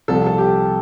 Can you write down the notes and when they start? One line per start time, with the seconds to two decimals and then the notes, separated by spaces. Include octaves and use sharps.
0.08 C2 C3 F3 A4
0.27 A4
0.38 G4